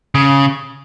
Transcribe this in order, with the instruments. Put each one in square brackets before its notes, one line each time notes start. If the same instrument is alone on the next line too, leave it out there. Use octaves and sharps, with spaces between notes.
[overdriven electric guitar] C#3